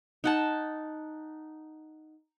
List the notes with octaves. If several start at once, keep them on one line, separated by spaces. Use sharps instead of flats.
D#4 F#5 A5